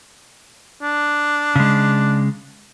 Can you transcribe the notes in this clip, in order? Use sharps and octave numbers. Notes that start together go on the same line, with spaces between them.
D4
C#3 G#3